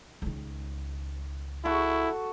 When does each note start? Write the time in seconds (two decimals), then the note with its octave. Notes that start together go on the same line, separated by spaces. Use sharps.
0.22 C#2 D#3
1.65 E4 F#4 A4